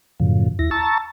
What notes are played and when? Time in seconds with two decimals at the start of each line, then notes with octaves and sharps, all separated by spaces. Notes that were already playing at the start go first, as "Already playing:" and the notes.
0.20 F#2 A2 C#3 F3
0.59 D#2 E4 A#6
0.71 A5 A#5 C#6 E6 A6